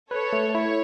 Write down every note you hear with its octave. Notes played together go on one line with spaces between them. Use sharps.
A4 B4 C#5
A3
E4 C#5